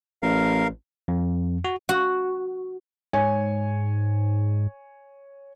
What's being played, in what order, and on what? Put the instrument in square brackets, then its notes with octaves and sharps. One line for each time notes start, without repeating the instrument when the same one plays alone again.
[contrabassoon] A1 [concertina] A#4 F5
[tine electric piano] F2
F#4
[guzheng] F#4
[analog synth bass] G#2 [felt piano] C#5 G#5